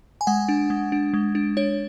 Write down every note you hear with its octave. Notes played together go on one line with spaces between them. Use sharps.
G#5
G#3 F#5
D4
G#3
D4
G#3
D4
D4 C#5